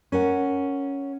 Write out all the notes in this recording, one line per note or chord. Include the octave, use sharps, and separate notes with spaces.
C#4 A#4 F#5